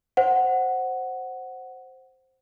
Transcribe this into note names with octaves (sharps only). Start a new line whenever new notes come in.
C5 F#5